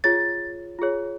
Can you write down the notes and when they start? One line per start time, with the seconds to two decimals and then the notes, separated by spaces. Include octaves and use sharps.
0.04 F4 G#4 C#5 A6
0.79 F4 G#4 C#5